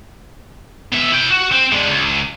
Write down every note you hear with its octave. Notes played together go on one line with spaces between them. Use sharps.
B2 E5
E4 G5
F#4
C4
G#3 D4
C#2